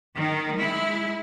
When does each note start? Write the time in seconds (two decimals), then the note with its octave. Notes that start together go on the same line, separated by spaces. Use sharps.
0.15 D#3
0.57 G#3 E4